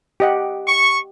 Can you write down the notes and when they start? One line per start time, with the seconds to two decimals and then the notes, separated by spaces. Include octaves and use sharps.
0.20 G4 D#5 F#5
0.66 C#6